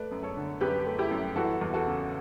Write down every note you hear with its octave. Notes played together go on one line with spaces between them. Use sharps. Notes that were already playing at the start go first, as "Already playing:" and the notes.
Already playing: A3 B4 D5
F#2
A4 C#5
D3
F#2 G4 B4
A3
E4 G4
F#2
E3 F#4 A4
E2
F#4 A4
C#3